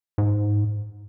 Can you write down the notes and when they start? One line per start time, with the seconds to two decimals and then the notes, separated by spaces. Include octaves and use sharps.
0.18 G#2